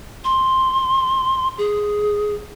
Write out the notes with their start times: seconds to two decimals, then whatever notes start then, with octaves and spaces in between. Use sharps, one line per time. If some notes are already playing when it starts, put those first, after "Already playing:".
0.24 C6
1.58 G#4